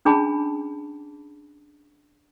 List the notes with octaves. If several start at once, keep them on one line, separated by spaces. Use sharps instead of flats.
C#4 D4 G#4 G#5 A5 B5